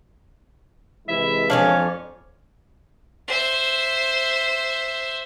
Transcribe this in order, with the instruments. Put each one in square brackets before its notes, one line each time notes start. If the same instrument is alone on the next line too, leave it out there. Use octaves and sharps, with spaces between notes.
[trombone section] C3 E3 G#3 [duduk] E4 [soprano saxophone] E5
[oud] F2 C#4 D4 [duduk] C#5 [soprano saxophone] F5
[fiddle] C5 E5